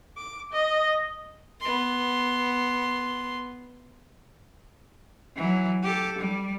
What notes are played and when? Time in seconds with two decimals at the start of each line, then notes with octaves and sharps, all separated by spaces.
0.17 D6
0.52 D#5
1.61 B3 C6
5.35 E3 F#3
5.83 G4 A4
6.19 G3